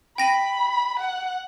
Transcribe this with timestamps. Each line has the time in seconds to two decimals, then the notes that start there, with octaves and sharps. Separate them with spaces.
0.18 G5 B5 A#6 D#7
1.00 F#5